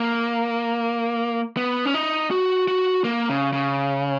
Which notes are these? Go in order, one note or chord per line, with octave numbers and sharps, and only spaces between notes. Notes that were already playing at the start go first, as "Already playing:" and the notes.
Already playing: A#3
B3
C#4
D#4
F#4
F#4
A#3
C#3
C#3